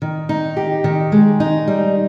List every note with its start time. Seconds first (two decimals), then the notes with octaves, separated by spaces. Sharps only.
0.02 D#3
0.29 D#4
0.57 G4
0.84 D#3
1.12 G#3
1.40 D#4
1.68 G3